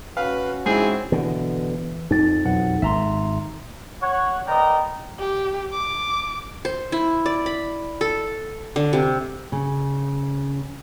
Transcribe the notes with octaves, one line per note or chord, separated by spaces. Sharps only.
C#4 F#4 B4 F5
G#2 C4 E4 G#4
B2 D3 E3
F2 D#4 A6
B1 E2 F#5
G#1 E5 A#5 C6
C#5 F#5
B3 A#4 D5 D#5 G5 A#5
G4
D6
C5
E4
D5
B5
A4
D3
C3
C#3